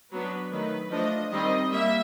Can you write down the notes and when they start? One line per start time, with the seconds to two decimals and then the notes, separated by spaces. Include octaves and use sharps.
0.12 F#3 B3 D4 B4
0.52 D#3 F#3 A3 B4
0.91 F3 A3 D4 D#5
1.32 D#3 G3 C4 D#5
1.72 G3 A#3 E5